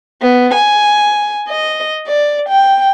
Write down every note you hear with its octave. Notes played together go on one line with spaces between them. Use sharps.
B3
G#5
D#5
D5
G5